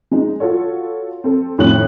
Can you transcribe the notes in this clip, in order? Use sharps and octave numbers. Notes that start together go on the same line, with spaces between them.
G#3 D#4
F4 F#4 A4 C#5
C4 A4
F2 A2 D#3 C#5 F#6 F#7